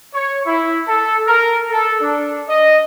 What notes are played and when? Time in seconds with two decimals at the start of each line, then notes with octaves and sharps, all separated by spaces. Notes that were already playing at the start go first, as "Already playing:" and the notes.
0.14 C#5
0.46 E4
0.88 A4
1.28 A#4
1.71 A4
2.01 D4
2.49 D#5